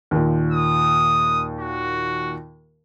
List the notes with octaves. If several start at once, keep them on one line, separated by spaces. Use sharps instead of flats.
D#2 A#2
D#6
F#4